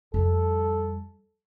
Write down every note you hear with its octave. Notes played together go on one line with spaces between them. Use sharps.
F2 G3 A4